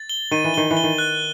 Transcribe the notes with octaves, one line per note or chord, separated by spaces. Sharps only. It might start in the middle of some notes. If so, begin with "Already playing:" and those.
Already playing: A6
G7
D#3 D#7
E3
D#3 G7
E3
G7
D#3
F#6